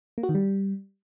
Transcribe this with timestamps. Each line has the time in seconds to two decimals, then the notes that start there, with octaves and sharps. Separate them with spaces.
0.18 A#3
0.23 F#4
0.29 D#3
0.35 G3